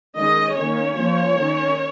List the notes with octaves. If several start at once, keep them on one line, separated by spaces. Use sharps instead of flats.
D#3 G#3 C#4 D#5
D#3 A#3 C#4 C#5
F3 A#3 C#4
D#3 C#4